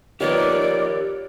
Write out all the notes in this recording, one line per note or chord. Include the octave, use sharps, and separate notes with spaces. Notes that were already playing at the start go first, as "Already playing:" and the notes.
D#3 F3 B3 G4 A#4 C#5 D5